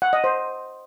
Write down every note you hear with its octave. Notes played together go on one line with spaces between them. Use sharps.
F#5
D#5
C5